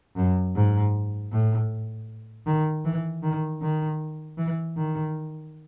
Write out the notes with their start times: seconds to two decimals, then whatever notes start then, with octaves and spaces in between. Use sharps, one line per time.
0.16 F#2
0.55 G#2
1.32 A2
2.47 D#3
2.85 E3
3.23 D#3
3.62 D#3
4.38 E3
4.77 D#3